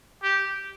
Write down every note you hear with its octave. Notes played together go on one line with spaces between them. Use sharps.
G4